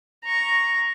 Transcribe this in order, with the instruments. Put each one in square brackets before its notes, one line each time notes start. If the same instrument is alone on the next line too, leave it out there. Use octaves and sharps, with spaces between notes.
[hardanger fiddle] A#5 C#6